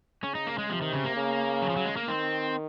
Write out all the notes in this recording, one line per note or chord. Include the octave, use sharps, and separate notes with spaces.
C#3 C#4
D#4
A#3
G#3
C3 F3
D#3
C#3
A#3
C#3
F#3
F3
F#3
G#3
A#3
D#3 C4